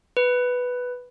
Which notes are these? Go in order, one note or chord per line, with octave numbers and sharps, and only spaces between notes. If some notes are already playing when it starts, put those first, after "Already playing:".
B4